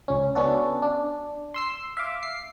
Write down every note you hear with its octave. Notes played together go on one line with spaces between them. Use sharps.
C#2 C#4
B3 C#4 D4 F#4 A4
D4
C6 E6 C7
E5 F5 D6
C7